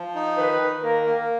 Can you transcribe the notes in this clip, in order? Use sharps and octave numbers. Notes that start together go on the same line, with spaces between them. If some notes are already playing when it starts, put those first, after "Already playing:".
Already playing: F3
D#4
D#3 B4
D#3
A#3 A#4
A#3